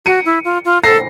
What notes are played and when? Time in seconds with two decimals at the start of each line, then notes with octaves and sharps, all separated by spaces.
0.06 F#4 C#7 D#7
0.25 E4
0.45 F4
0.65 F4
0.83 A4 A#6 C7